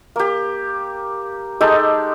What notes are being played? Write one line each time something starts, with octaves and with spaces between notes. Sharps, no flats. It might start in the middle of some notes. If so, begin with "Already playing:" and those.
A#3 G4
G#3 D#4 G4 A4